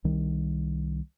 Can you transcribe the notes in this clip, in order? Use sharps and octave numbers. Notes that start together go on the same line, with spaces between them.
C2 D#3 G3